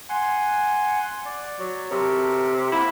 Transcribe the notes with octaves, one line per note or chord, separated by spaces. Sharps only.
F#5 G#5 C6
D5
F#3
C3 A4 A#4
A#3 E4 F#5